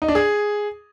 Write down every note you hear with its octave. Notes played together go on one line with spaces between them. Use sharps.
D#4
D4
G#4